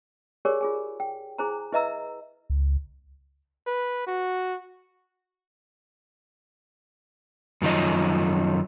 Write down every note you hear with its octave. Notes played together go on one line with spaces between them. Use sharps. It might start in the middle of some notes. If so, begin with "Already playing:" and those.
G4 G#4 A#4 C#5 D5 G#5
F4 G#4 G#5
G5
E4 G#4 C5 G#5 A#5
E4 B4 D#5 E5 A#5 E6
C#2
B4
F#4
F#2 D#3 F3 D#5